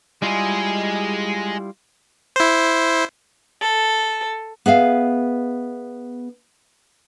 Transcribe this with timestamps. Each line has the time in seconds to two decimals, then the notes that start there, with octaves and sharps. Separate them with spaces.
0.22 G3 G#3 E4 F4 G#4
2.36 E4 C5
3.61 A4
4.66 B3 G#4 E5 F5